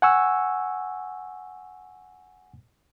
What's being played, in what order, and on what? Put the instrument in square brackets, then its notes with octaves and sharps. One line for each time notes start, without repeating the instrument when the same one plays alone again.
[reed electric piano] F#5 G#5 C#6 E6